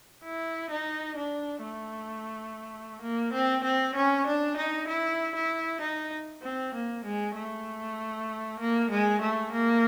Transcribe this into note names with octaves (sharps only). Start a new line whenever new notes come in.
E4
D#4
D4
A3
A#3
C4
C4
C#4
D4
D#4
E4
E4
D#4
C4
A#3
G#3
A3
A#3
G#3
A3
A#3